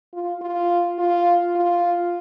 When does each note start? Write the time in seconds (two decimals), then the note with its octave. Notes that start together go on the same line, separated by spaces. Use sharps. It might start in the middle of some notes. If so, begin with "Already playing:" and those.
0.14 F4
0.41 F4
0.98 F4
1.55 F4